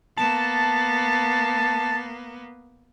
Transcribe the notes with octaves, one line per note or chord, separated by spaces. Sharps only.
A#3 B3 A5